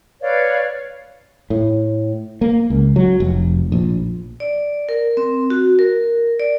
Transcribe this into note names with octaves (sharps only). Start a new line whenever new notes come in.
B4 C#5 D5 F5
A2
A#3
C#2
F#3
F1
A#1
D5
A#4
C4
F#4
A#4
D5